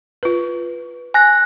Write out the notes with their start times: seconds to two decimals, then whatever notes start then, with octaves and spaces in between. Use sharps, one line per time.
0.23 F4 B4
1.14 G#5 F#6 A#6